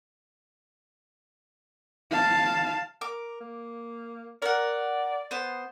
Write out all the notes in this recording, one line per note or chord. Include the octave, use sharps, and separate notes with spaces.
F5 A5
A#4 D6
A#3
A#4 D5 F#5
B3 C5